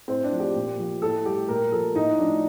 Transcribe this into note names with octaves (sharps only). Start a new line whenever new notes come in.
A2 C4
D4
F3
G4
A#2
F3
A2 A4
G3 G4
A#2 A#4
F3 A4
A2 D#4
F3 D4